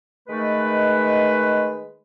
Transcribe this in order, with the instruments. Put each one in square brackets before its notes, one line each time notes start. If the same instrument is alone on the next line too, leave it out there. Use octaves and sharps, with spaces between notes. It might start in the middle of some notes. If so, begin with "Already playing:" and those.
[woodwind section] D#3 G#3 A3 B4